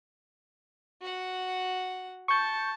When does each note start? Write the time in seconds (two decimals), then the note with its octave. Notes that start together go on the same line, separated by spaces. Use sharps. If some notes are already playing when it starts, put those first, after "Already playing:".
1.01 F#4 F#5
2.28 A5 C#6 G6